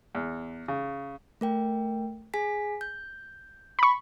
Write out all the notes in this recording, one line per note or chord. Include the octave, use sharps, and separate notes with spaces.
E2
C#3
A3 A#4 G5
G#4 G#5 B6
G6
B5 C#6